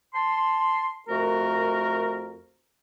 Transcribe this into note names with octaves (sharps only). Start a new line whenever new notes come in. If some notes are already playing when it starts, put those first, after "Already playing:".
A5 C6
F2 A3 F#4 A#4